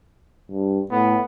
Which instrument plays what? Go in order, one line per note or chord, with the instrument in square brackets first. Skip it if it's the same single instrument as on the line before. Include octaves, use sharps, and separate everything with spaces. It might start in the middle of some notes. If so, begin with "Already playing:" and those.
[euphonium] G2
[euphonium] A2 [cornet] B3